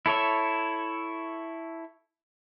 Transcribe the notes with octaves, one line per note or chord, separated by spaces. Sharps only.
E4 A4 C#5 E5